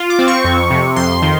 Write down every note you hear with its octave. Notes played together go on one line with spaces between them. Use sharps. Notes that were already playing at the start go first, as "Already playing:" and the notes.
Already playing: F4
D6
C4
C#6
F2
C3
F2 C6
D#3